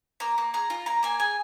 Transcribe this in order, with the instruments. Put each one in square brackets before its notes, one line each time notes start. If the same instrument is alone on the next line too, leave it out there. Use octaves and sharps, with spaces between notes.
[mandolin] A#3 A#5
A#3
G#4 A#5
F4
A#3 A#5
A#3 G#5
G#4 G#5